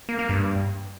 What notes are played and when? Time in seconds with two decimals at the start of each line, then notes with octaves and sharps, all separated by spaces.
0.09 A#3
0.19 A#3
0.29 G2